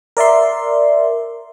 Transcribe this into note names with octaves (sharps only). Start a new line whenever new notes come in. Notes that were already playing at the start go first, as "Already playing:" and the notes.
A#4 D5 E5 C6